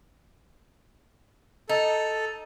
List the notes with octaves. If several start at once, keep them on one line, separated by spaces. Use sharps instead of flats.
D#4 A4